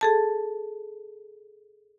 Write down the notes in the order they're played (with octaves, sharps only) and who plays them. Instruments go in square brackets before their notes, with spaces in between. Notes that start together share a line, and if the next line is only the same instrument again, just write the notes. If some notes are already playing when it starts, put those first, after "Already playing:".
[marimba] G#4 A4 A5